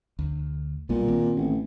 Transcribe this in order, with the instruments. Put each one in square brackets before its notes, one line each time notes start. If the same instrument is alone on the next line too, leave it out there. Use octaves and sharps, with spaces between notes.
[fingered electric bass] D2
[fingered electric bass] B1 G3 B3 [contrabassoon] A#2
[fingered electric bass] D#3 A#3 C4
[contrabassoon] A1